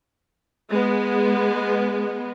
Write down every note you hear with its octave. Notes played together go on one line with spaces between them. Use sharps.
G#3 B3